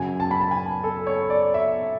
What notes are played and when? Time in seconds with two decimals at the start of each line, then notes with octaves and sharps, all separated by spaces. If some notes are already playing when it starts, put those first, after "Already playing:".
Already playing: F#2 C#3 F#3 G#5
0.20 A5
0.31 B5
0.41 A5
0.51 G#5
0.84 A4
1.07 C#5
1.30 D5
1.54 E5